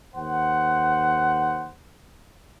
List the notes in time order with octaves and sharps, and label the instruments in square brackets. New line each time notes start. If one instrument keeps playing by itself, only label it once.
[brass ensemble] D#2 C5 F#5